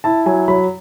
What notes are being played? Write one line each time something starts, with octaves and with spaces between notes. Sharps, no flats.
E4 A5
F#3 G#5
F#3 B5